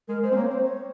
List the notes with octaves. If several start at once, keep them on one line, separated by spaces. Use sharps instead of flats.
G#3 A#4
G#3 C5
C4
A#3 C#5
C4 C5
C#5